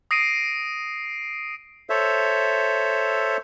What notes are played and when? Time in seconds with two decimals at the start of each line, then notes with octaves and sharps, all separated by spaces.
0.11 D#6 A#6 C7 D7 D#7
1.90 A4 C5 C#5 E5